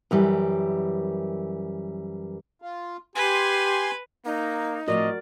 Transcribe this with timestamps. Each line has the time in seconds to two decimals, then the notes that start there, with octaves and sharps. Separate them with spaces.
0.11 F#2 E3 G3
2.62 F4
3.16 G4 B4 G#5 C6
4.25 A#3 D#4
4.88 A2 F3 C4 F#4 A#4 D5 D#5